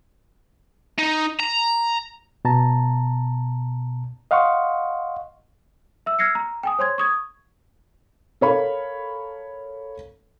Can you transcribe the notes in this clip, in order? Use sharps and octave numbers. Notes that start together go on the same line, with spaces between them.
D#4
A#5
B2 A5 A#5
D#5 F5 F#5 C6 C#6
E5 E6
E6 F6 G#6 A#6 C7 C#7
A#5
G5 G#5 D#6
C5 C#5 C6 G#6
C#6 D#6 G#6
A4 A#4 C#5 F5 B5